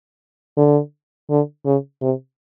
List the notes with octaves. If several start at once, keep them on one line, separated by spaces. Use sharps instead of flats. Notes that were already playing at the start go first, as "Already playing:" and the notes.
D3
D3
C#3
C3